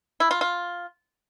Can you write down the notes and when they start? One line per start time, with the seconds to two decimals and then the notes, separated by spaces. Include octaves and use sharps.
0.20 E4
0.31 F4
0.41 F4